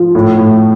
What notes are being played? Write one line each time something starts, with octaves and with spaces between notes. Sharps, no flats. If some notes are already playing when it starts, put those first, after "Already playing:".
Already playing: F3
A2
A2